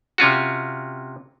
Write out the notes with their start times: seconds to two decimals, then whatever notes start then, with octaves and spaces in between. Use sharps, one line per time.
0.18 C3 C#4 F4 F#4